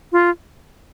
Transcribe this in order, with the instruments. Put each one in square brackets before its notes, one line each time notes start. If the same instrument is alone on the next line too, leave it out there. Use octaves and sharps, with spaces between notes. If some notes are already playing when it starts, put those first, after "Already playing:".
[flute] F4